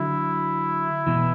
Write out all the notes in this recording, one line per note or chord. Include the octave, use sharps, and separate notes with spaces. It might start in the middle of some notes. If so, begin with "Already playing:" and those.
Already playing: D3 F#3 E4
B2 E3